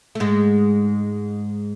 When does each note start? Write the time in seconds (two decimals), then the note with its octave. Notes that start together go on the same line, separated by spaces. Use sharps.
0.15 A3
0.20 G#2 G#3